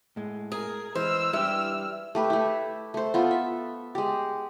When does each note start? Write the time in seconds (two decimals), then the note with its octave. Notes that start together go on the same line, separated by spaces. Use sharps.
0.16 A2 G#3
0.52 G#4 A#4
0.95 E3 G#3 C5 E6 F6
1.33 E3 G3 D4 G4
2.15 A3 G4 B4
2.30 A3 E4
2.94 A3 C5
3.14 B3 F4 A4
3.31 E5
3.95 G#3 G4